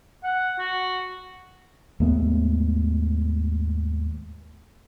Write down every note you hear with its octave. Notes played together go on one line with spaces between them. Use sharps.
F#5
F#4
D#2 G#2 A3 B3